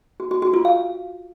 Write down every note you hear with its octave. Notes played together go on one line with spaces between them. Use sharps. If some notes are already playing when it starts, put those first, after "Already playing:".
F#4
F#4
F#4
F4
F5